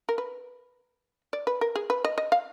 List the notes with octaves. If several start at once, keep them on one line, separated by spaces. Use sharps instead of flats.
A#4
B4
D5
B4
A#4
G#4
B4
D#5
D#5
F5